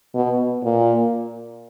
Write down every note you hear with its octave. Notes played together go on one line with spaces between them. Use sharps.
B2
A#2